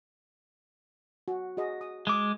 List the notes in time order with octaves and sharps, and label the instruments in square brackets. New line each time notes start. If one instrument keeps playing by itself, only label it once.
[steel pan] F#4
F#4 G#4 D#5
D#6
[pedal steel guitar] G#3 D6